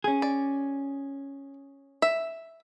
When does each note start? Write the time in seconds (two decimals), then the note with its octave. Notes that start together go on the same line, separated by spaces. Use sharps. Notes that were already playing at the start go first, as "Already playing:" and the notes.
0.04 C#4 G#4
0.22 D5
2.02 E5